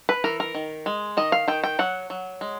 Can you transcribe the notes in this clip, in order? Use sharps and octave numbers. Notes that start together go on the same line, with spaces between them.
B4
E3 A#4
A#4
D#3
G#3
D#3 D#5
F5
D#3 G5
G5
F#3 F#5
F#3
G#3